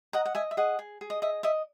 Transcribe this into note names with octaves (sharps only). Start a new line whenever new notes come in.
D#5 F#5 A#5
F#5
D#5 E5 G#5
E5
G#4 D#5 F#5
G#4
G#4
D#5
D#5 E5
D#5 E5